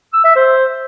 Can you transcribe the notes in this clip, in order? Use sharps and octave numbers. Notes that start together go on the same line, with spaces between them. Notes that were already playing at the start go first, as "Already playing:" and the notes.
E6
E5
C5